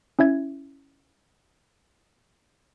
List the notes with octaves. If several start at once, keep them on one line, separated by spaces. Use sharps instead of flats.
C#4 E4 E5 G#6